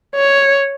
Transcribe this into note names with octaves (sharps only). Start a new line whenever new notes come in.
C#5